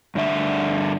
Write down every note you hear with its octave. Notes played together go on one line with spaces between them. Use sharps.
G2 D3 E5